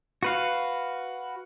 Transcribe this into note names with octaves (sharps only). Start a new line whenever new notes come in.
F#4 B4 F5